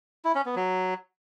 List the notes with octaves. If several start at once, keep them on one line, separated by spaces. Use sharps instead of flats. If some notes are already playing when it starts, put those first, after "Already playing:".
E4
C#4
B3
F#3